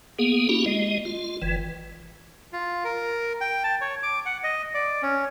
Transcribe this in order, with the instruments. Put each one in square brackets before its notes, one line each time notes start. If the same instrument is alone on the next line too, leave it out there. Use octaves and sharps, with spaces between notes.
[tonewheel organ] A#3 B3 G#4
A#3 C#4 E4 F#4 G4
G#3 D#5
F4
G1 E3
[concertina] F4
A#4
G5
A5
C#5
D6
F#5
D#5
D5
C#4